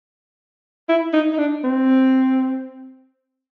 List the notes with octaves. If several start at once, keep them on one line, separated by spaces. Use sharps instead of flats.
E4
D#4
D#4
D4
C4